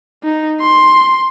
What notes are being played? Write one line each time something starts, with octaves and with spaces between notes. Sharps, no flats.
D#4
C6